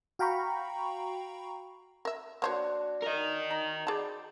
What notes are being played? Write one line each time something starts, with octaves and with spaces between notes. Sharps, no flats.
F#4 F5 G5 A#5 B5 C#6
A#4 E5
A#3 D4 F#4 C5 C#5
A#4 D#5
D#4 A#5
G#4 C5 D5 A5 B5